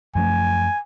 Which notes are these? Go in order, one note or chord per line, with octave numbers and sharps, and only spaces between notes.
F#2 F3 A3 G#5